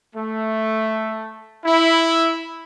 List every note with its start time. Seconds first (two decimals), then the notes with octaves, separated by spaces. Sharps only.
0.14 A3
1.65 E4